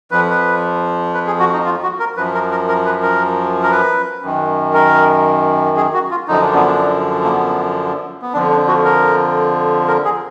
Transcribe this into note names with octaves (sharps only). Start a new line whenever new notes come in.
F2 F3 B4
B4
B4
G#4
F#4
D#4
F4
F#4
A#4
F#2 F3 B4
A#4
A#4
A#4
B4
A#4
A#4
B4
F#2 D#3
A#4
G#4
F#4
F4
F#2 D3 F3 D#4
D4
B3
D4
A#3
B3
B3
F2 D3 F3 D4
D4
F#4
A#4
A#4
G#4